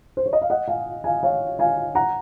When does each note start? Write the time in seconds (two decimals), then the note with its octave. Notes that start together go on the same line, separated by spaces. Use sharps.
0.17 C5
0.26 C#5
0.33 D#5
0.42 F5
0.50 D#5 F#5
0.68 F5 G#5
1.04 F5 G#5
1.23 C#5 F5
1.59 F5 G#5
1.95 F#5 A#5